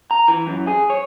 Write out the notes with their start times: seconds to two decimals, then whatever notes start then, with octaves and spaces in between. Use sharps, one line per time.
0.11 A#5
0.28 E3
0.47 F#2
0.67 G#4
0.90 C#5